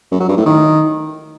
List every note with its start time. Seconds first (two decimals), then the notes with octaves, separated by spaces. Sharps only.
0.11 F#2
0.20 F#3
0.28 G2
0.37 A2
0.45 D#3